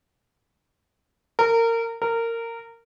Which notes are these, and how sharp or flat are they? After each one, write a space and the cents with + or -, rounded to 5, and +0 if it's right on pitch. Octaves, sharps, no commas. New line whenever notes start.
A#4 -25
A#4 -20